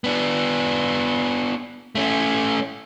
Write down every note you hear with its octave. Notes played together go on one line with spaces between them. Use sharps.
B3 D4
A3 C#4